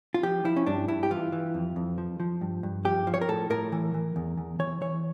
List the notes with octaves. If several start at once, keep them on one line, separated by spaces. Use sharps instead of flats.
F4
F3 G4
F3 E4
C#4
G2 D4
G2 E4
G4
E3 F4
E3
F2
F2
F3
F3
G2
G2
F3 G4
F3
C#5
A#4
A2 A4
A2 A#4
E3
E3
E2
E2
E3 C#5
E3 C#5